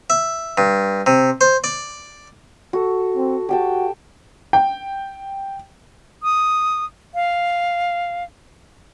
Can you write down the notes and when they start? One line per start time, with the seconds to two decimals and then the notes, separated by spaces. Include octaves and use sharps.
0.10 E5
0.58 G2
1.06 C3
1.41 C5
1.64 D5
2.73 F#4 A4
3.17 C4
3.49 F#4 G4 G5 A5
4.53 G5
6.23 D#6
7.15 F5